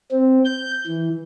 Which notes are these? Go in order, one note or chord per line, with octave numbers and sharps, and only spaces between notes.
C4
G6
E3